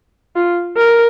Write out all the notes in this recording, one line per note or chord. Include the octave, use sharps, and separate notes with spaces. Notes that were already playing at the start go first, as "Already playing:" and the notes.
F4
A#4